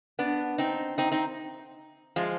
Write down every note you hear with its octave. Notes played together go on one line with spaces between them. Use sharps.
B3 D4
C4 D#4
C4 D#4
C4 D#4
F3 G#3